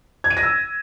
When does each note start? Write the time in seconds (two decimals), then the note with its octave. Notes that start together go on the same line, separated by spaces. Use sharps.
0.24 G#6
0.30 D#7
0.37 A#6
0.43 E6